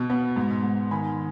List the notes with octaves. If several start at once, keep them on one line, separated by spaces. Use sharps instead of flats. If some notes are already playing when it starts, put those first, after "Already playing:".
Already playing: B2
B3
G#2
G#2
D#3 G#5 B5